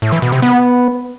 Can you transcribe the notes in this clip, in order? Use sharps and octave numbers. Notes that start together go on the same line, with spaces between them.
A2
E3
B2
C3
B3